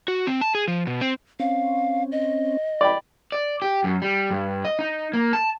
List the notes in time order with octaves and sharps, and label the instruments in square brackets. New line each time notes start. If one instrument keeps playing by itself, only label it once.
[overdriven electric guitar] F#4
C4
A5
G#4
F3
B2
C4
[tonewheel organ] C4 C#4 [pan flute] F5
[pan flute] D#5
[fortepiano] D5 G5 B5
[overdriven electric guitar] D5
G4
F#2
G3
G2
D#5
D#4
A#3
A5